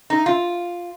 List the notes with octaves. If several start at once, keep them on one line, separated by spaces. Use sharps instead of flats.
D#4
F4